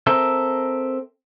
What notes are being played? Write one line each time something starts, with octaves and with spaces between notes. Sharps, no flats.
C4 A4 A#4 E5